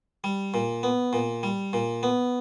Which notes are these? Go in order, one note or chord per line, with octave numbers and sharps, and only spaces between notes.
G3
A#2
B3
A#2
G3
A#2
B3